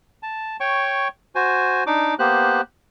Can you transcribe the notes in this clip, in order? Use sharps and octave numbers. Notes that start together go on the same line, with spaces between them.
A5
C#5 G5 C#6
F#4 C5 G#5
D4 D#4 D6
A#3 B3 G4 C5 F#6